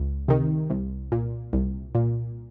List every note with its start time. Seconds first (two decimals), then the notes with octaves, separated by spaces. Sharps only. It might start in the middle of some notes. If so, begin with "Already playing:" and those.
Already playing: C#2
0.28 C3 D#3
0.70 C2
1.12 A#2
1.53 C2
1.95 A#2